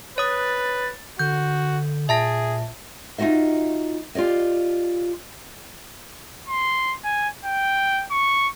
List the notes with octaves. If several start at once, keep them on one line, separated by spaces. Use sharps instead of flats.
B4 C#5 D#6 A6
D3 F#4 G6
A#2 G#4 E5 A5 A#6
D#4 F4 F#4 D#5 E5
F4 G4 D5 D#5
C6
G#5
G5
C#6